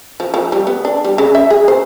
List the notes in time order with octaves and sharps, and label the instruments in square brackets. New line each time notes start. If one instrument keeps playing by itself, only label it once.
[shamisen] F3
F3
G3
B3
D4
G3
C#3
E5
G#4
C5